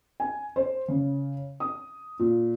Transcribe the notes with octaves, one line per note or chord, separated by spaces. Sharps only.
G#5
C5
C#3
D#6
A#2